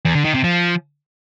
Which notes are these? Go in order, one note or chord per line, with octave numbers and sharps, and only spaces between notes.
E2
D3
D#3
C3
F3